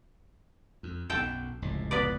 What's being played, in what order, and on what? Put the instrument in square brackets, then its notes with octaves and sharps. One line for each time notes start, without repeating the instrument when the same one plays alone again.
[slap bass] F2
[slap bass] B1 F#2 [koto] A4 G5 A5
[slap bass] F1 C#2 A2
[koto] B3 B4 D5